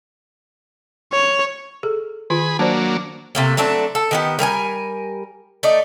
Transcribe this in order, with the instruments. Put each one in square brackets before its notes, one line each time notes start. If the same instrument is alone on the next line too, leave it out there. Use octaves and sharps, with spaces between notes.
[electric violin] C#5
[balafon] G#4 A4
[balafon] D#3 F4 [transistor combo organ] G#4 B5
[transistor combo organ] F#3 A#3 D4 [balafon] C5 D5 A5
[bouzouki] C3 A3 A#3
F#3 A3 C4 D4
A4
D#3 B3 G4
G3 A#4 D#5 G#5
A3 D#4 D5